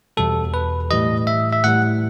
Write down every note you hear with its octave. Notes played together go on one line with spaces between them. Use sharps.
E2 B2 G3 A4
B4
A2 E3 G3 D#5
E5
E5
A2 E3 G3 F#5